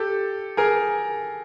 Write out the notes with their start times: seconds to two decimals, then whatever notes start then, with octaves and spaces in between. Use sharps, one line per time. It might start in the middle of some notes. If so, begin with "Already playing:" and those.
Already playing: G4 A4
0.57 G#4 A#4